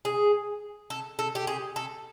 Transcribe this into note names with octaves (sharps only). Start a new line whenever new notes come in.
G#4
A4
A4
G4
G#4
A4